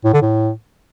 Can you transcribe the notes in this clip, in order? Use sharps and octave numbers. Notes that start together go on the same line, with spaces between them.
A2
D3
A2